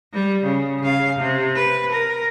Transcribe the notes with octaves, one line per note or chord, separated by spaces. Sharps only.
G3
C#3
C#3 F5
C3
B4
A#4